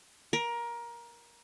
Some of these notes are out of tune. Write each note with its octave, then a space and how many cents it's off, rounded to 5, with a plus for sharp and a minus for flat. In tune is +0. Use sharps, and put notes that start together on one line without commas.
A#4 +20